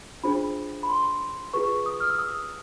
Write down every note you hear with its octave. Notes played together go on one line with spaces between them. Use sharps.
D4 F4 G#4 C5 B5
B5
C6
F4 G#4 B4 C#6
D#6
F6
E6
D#6